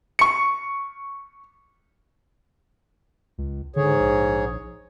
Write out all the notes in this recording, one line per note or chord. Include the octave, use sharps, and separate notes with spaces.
C#6 C#7
C#2
G#2 D3 G#4 C#5
A#1